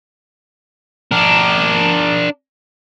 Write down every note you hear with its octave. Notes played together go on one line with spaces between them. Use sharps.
D4 A#4